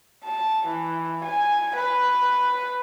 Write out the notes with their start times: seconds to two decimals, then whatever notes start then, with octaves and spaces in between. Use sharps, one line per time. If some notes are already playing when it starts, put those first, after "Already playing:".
0.25 A5
0.66 E3
1.25 G#5
1.75 B4